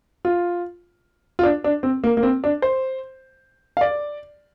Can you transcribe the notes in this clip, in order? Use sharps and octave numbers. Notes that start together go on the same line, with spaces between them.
F4
F4
D4
D4
C4
A#3
A#3
C4
D4
C5
F5
D5